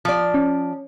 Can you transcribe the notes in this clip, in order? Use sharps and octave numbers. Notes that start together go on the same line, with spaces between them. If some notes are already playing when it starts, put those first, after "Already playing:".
F3 D5
C#4